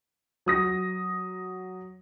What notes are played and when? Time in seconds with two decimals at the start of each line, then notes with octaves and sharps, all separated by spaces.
0.46 F#3 D#6 A#6